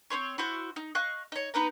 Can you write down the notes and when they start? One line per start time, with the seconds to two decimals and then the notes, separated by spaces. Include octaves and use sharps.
0.10 C4 D4 C5 C#5
0.38 E4 F#4 C5
0.76 D#4
0.95 D#5 F5 C#6 F#6
1.32 D#4 C#5
1.54 B3 D#4 B4 A#5